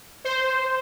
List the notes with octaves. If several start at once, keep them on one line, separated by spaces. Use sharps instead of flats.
C5